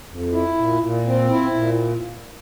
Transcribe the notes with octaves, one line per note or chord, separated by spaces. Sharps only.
F2
E4
A#2
A#2
C4
E4
A#2